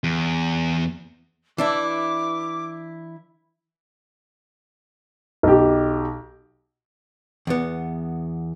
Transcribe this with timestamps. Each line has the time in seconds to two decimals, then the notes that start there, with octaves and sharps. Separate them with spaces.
0.04 E2
1.58 E3 D4 E4 D6
5.43 B1 G4
7.47 E2 B3